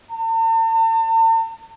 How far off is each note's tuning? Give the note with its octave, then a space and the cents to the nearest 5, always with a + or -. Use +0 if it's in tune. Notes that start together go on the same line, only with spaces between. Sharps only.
A5 +45